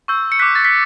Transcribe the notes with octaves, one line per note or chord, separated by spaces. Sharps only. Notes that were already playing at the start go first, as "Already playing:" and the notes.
C#6 E6 G6
C#7
D6 F#6 B6
A6
B6